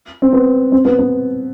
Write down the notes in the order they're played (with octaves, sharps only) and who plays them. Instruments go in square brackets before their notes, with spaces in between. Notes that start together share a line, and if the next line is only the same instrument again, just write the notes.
[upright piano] C4
B3
C4
B3
B3